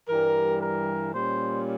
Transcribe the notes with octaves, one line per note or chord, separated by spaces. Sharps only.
G2 E3 G3 A#4
A#4
A#2 G3 C#4 C5